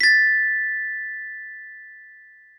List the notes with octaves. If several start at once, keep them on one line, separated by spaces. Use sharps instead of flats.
A6 B6